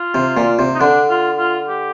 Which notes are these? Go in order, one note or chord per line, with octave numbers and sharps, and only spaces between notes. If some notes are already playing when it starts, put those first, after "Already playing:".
Already playing: F4
C3
A#2
C3
D#4
D3 D4
F4
F4
G4